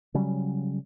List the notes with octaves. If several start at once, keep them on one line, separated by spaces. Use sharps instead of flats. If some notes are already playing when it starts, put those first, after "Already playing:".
C#3 F#3 G3 C#4